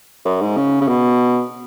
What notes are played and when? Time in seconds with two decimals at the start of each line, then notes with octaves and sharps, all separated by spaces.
0.25 F#2
0.41 G#2
0.57 C#3
0.81 C#3
0.88 B2